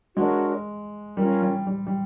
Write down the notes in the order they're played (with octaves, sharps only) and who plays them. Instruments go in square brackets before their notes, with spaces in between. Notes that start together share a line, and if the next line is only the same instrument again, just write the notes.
[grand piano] G#3 [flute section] D4 F#4 A#4 C#5
[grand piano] G3 [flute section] C#4 F4 A#4
[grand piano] G3
G3
G3